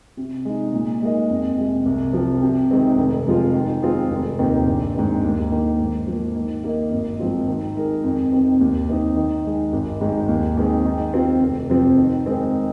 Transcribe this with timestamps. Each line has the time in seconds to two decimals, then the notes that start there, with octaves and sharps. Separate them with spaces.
0.17 C3
0.45 G#3 D#4
0.73 A#2
1.02 G#3 D#4 A#4 D#5
1.30 F2
1.58 C3 G#3
1.86 C2
2.13 C3 F3
2.42 C3
2.70 D#3 G#3 C4 G#4
2.98 F1
3.26 F2 F3 G#3 F4
3.54 D#3
3.82 G#3 C4 F4 G#4
4.11 F1
4.39 D#2 D#3 C4
4.67 A#1
4.95 G#2 D#3 C4
5.23 D#2
5.51 D#3 A#3
5.79 G#2
6.07 F3 A#3
6.36 D#3
6.63 A#3 D#4 A#4 D#5
6.91 G#1
7.19 G#2 F3 C4 F4
7.48 D#3
7.76 G#3 D#4 A#4
8.04 F2
8.32 C3 D#3 C4
8.61 D#2
8.89 D#3 C4 D#4
9.16 D#3
9.45 G#3 D#4
9.73 G#1
10.01 G#2 D#3 G#3
10.29 D#2
10.57 D#3 G#3 C4 G#4
10.85 D#3
11.14 C4 F4
11.41 F1
11.69 F2 F3 C4
11.98 D#3
12.26 G#3 C4 D#4 A#4